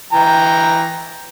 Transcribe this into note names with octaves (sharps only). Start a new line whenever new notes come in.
E3 G5 A#5